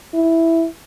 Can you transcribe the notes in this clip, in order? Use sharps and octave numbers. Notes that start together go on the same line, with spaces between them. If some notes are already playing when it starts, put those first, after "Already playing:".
E4